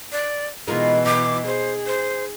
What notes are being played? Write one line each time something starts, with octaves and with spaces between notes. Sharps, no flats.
D5
B2 E3 G#3 D#4 F4 A#4
D#4 D6
G#4 C5
C5